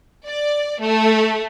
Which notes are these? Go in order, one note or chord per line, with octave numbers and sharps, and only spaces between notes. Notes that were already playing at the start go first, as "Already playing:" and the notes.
D5
A3